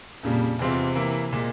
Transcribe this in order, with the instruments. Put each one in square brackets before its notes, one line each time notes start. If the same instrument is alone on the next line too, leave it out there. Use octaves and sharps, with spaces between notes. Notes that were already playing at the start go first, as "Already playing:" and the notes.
[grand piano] F2 C#3 G3 [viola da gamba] A#2
[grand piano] E2 E3 G#3 C4 F4 [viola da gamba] C3
[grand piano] E3 A#3 E4
A#2 G#3